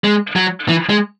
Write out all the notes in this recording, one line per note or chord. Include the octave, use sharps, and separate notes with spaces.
G#3
F#3
E3
G#3